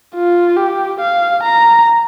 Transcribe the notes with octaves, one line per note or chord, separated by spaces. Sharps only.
F4
G4
F5
A#5